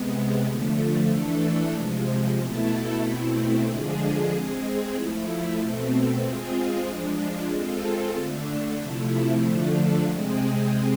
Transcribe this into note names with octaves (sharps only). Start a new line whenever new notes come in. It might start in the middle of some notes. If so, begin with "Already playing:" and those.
Already playing: C3 G#3 B3
D3 F3 A3
E3 A3 D4 A4
C3 F3 G#3
B2 A3 E4 A4
B2 A3 C4 E4
D3 F3 G#3 D4 G#4
G#3 C4 G#4
F3 A3 E4
B2 A3 C4
G#3 C4 F4 G#4
F3 G#3 D4
G#3 C4 F4 A4
D3 A3 D4
C3 F3 A3 E4
D3 F3 A3 D4
C3 G#3 C4 G#4